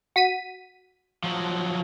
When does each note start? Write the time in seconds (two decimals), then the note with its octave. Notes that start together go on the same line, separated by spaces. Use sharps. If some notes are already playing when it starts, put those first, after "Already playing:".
0.16 F#4 B6 D#7
1.24 F3 F#3